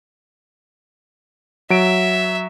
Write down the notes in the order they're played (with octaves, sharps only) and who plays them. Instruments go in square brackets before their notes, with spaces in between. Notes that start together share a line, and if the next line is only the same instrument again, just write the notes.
[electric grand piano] F#3 D7 [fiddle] E5